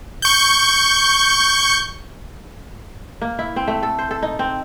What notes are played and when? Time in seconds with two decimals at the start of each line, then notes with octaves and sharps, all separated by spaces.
0.22 C#6 G6
3.22 A#3
3.39 E4
3.56 C4
3.68 A3
3.83 A4
3.99 C5
4.11 A4
4.23 D#4
4.39 C4